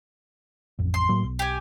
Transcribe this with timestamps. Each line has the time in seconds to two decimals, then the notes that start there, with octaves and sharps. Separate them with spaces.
0.79 A1 F2
0.94 C6
1.09 A2 F#3 A#3
1.24 B1
1.39 G4 G#5